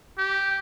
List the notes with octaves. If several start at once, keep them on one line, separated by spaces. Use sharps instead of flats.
G4